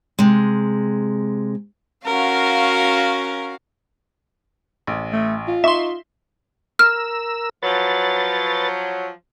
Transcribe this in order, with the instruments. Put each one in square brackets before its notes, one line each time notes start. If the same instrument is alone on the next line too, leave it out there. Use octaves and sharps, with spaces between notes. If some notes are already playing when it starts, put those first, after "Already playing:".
[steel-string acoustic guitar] C3 G#3
[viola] C#4 A#4 [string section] F#4 F5
[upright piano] A1
[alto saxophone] A3
F4
[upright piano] D#4 C#6 [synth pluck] E5 C6
[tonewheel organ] A#4 E6 [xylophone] F6
[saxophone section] F3 F#3 [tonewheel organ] B4 A6